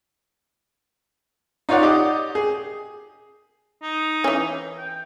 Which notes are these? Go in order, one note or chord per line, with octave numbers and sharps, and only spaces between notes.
D#4 F4 C#5 D5 F#5
G4 D#5 D6
G#4
D#4
E3 C#4
G5